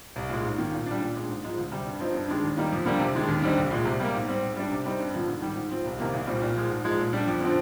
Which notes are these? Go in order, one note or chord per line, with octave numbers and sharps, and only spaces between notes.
C2
A#2 G#3
G#2
D#3 A#3
A#2
G3 D4
A#2
G#3 D4
G#2
F3 G#3 D#4
D2
C3 G3
G2
F3 C4 D#4
G2
D#3 G#3 D4
D#2
D#3 G3 A#3 D#4
F2
D3 G3 A#3
C3
D#3 G#3 D4
D#2
D3 G3 C4 D#4
C2
A#2 G#3
C3
G3 A#3
G#2
G3 C4
G#2
G3 D4
C3
G3 C4 D#4
G2
D3 F3
G#2
D#3 G3
G#2
F3 C4
C2
C3 D#3 A#3 D#4
C2
A#2 G3 C4
A#2
F3 G#3
G#2
F3 G#3 D#4
A#2
G3 D4
F2
D3 F3 C4